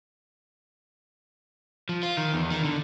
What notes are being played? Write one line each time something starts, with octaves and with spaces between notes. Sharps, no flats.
F3
F4
D#3
E2
D#3
D3